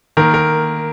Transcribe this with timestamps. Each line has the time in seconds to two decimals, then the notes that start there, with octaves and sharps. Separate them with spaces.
0.17 D#3 A#3 A#4
0.34 A#4